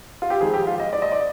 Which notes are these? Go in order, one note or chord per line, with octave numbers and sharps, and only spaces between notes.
F4
G4
F2 D#3 G#3 G#4
G4
F4
D#5
D5
D#5
D5